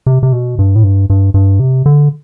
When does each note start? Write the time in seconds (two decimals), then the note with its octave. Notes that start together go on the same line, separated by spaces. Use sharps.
0.06 C3
0.23 C3
0.32 B2
0.59 G2
0.76 A2
0.84 G2
1.10 G2
1.34 G2
1.60 C3
1.86 D3